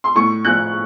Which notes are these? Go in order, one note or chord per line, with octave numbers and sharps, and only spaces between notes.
C6
A2 C#6
F3 F#6